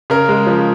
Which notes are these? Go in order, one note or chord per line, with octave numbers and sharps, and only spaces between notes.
C#3 A#4
G#3
F3